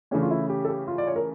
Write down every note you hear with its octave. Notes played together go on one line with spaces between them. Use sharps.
C#3 E3 A3 C#4 D4
F4
E4
G4
A4
G4
F4
D5
C#5
A#4